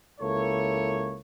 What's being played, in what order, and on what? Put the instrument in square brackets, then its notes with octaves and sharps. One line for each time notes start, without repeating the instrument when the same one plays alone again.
[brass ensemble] C#2 A#3 E4 A4 C#5